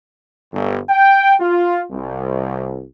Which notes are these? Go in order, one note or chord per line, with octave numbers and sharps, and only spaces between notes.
G1
G5
F4
C2